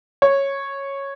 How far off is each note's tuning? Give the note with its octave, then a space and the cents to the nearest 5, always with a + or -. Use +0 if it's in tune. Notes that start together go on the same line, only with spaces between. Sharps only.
C#5 -10